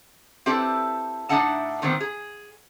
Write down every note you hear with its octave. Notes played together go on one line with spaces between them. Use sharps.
C4 E4 G4 A4 B4 D5
A2 D4 D#4 E5 F#5 A5
A#2 D#3 G3 B3 C4
G#4